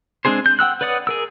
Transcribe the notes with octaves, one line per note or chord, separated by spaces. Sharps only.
G#3 C4 D4 G#4 C5
G6
F#5 G5 E6 F#6
B4 C#5 D5 F#5 D#6
G#4 A#4 E6